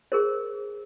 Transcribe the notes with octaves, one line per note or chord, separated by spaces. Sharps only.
G#4 A#4 C5